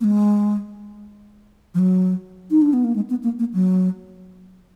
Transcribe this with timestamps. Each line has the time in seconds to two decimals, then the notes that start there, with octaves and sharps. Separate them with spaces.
0.01 A#3
0.04 G#3
1.74 F3
1.79 F#3
2.51 D#4
2.62 D4
2.73 B3
2.84 A#3
2.96 G#3
3.10 B3
3.23 A#3
3.39 A#3
3.54 F#3